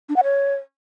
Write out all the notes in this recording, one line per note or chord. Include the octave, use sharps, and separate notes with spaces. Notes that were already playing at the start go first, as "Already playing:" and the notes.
D4
F#5
C#5